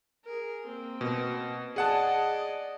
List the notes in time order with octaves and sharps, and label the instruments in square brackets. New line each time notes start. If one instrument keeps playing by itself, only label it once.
[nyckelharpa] G#4 A#4
A#3 C4
[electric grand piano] B2
[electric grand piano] G#4 F#5 A5 [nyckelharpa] D5 D#5